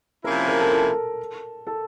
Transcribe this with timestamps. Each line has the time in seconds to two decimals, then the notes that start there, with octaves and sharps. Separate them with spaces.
0.24 C3 F3 A#3 C#4 E4 A#4
0.48 A#4
0.60 A4
0.72 A4
1.67 A4